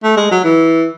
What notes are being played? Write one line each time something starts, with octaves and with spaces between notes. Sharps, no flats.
A3
G#3
F#3
E3